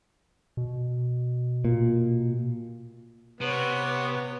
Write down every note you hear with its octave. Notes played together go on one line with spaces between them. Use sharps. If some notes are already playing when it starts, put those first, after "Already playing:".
B2
A#2
C3 B3 B4 C#5